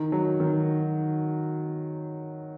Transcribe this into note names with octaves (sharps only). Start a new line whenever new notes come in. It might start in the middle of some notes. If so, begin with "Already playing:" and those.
Already playing: D#3
F#3
D#3